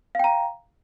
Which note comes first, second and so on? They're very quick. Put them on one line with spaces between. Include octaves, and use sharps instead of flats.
F5 G5 A#5